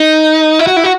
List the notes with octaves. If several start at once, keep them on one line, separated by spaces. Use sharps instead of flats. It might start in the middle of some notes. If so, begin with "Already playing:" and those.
Already playing: D#4
E4
F#4
E4
F#4